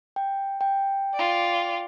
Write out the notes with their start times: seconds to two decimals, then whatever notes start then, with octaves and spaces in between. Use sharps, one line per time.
0.16 G5
0.61 G5
1.14 F4 D5